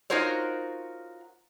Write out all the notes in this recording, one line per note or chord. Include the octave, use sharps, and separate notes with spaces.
D#4 F4 F#4 A#4 C5 C#5